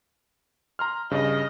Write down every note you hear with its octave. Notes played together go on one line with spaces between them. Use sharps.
A#5 C6 F6
G2 C#3 D#5